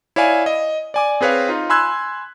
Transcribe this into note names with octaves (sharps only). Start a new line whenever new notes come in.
E4 C#5 D5 F5 G#5
D#5
D5 G#5 D6
C4 G#4 B4 C#5 F5
D#4 F4
G#5 B5 C6 E6 F#6 G#6